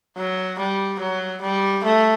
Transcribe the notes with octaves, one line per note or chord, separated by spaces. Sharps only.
F#3
G3
F#3
G3
A3